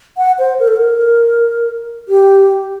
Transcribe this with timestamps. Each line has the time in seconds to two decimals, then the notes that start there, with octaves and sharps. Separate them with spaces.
0.17 F#5
0.39 C5
0.60 A#4
0.68 A4
0.76 A#4
2.08 G4